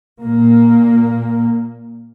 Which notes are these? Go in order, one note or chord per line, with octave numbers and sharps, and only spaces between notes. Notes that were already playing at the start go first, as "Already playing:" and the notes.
A#2 A#3